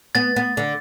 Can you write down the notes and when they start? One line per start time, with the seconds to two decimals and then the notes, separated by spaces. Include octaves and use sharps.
0.15 B3 A6
0.36 B3
0.57 D3